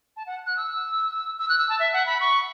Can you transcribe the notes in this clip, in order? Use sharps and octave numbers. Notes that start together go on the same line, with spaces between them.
A5
F#5
F#6
E6
E6
F#6
E6
A5
E5
F#5
B5
C#6